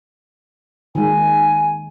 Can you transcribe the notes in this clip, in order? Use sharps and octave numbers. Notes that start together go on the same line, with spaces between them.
D#3 G#3 G#5